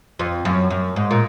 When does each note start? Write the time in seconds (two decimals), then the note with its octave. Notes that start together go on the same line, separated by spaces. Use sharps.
0.19 F2
0.45 F#2
0.70 F#2
0.96 G#2
1.11 A#2